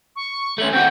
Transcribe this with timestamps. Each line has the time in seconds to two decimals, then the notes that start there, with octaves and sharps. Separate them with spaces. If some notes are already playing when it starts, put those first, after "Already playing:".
0.16 C#6
0.58 A3 C#4 F#7
0.73 C4 F#4 G5